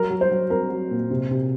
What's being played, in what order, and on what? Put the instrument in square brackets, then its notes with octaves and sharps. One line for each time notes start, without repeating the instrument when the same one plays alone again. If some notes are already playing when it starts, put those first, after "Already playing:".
Already playing: [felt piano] F#3 [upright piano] A#4
[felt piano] F#3
[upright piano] C5
[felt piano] F#3
[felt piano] C4 [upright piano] A#4
[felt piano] F#3
A#2
C3
C3